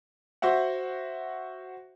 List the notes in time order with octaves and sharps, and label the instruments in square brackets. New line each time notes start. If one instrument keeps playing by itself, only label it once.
[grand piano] F#4 C5 E5 F#5